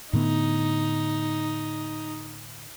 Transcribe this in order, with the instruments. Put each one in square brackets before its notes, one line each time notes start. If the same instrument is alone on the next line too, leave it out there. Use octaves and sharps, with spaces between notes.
[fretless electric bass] A2 D3 B3 [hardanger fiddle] D#4